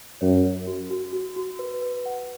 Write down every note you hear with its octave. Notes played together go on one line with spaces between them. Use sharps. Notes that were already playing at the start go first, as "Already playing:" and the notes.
F#2 C#5
C#5
F#4
F#4
F#4
F#4
B4
B4
F#5